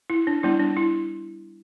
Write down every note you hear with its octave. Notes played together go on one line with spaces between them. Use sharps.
E4
D4
G3 B3 D4 E4
D4
E4